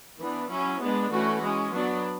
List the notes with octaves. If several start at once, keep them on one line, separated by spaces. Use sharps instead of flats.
E3 B3 D4
F#3 C#4 E4
G#3 B3 D4
E3 A3 C#4 F#4
G#3 C#4
F#3 B3 D4